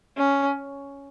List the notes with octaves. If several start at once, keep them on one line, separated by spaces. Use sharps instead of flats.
C#4